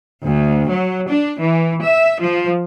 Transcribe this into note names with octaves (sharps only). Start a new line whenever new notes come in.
D2
F#3
D4
E3
E5
F3